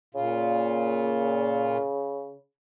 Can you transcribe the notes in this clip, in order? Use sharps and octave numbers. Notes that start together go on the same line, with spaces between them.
A#2 C#3 F4